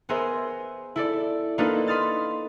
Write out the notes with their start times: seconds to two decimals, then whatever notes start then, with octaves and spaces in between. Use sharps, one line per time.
0.09 B3 G#4 A#4 C5 E5
0.96 E4 A4 D5
1.58 A#3 D4 D#4 F4 A4 B4
1.87 B5 C6 D#6 F6 A6